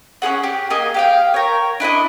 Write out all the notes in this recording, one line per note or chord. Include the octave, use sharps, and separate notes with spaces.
C#4 G4 G#4 F#5
G4
A#3 G#4 D#5 G#5
G4 F5 G5
A#4 C#5
D4 E4 B4 D#5